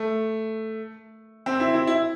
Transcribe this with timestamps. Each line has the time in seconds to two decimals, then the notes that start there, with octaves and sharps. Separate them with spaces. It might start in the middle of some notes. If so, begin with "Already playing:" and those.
Already playing: A3
1.46 C4
1.60 E4
1.74 E4
1.87 E4